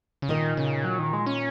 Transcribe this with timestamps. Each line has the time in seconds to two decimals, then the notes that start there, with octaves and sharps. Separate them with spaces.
0.22 C#3
0.29 A#2 D#3 A#3 D#4 A#4 D#5
0.57 C#3
0.84 F#3
0.99 D#3
1.13 G#3
1.26 C#4